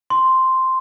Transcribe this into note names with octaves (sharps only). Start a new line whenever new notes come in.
C6